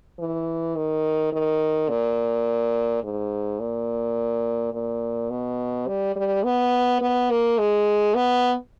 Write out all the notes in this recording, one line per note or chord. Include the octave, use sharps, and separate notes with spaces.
E3
D#3
D#3
A#2
G#2
A#2
A#2
B2
G3
G3
B3
B3
A#3
G#3
B3